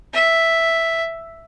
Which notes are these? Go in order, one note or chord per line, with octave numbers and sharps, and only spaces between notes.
E5